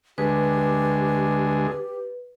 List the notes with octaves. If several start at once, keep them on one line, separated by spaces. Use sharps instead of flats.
D2 G#3 G4 B4